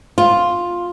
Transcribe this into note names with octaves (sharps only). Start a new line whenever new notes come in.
F4